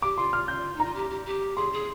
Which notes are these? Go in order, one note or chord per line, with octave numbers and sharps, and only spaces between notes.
G4 D6
F4 C6
F6
G6
D#4 A#5
F4
G4
G4
G4
G#4 C6
G#4